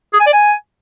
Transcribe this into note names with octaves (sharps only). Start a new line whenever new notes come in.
G#4
G#5
D5
G#5